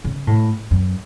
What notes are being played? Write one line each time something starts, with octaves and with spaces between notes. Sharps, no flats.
C#3
A2
F#2